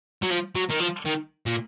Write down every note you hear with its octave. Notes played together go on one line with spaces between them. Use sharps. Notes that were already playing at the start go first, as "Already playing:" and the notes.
F#3
F3
F#3
D#3
F3
D#3
A#2